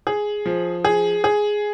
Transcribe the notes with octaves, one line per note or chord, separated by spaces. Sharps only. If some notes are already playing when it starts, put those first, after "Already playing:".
G#4
F3
G#4
G#4